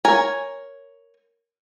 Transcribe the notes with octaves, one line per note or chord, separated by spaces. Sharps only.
A#4 C#5 G#5